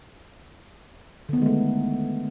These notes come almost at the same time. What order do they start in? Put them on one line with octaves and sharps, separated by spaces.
D3 B3 D#3 G#3 A3